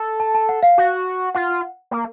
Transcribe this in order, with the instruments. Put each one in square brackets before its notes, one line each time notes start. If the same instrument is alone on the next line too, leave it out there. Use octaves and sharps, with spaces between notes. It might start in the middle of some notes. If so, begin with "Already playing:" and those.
Already playing: [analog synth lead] A4
[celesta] A5
A5
F#5
F5
[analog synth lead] F#4
[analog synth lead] F4 [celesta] F#5
[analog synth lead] A#3